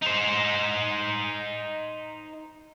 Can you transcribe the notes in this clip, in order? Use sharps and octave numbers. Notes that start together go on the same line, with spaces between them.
D#4 C5